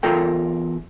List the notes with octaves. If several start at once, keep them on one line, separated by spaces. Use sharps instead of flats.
E2 F4 A4 A#4 G5